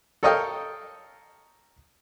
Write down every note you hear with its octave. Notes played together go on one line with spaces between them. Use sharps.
A4 A#4 C#5 D#5 F5 G5